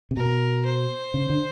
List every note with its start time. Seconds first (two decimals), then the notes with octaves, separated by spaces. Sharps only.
0.11 C3
0.17 B2 A#4
0.66 C5
1.14 C#3
1.30 D3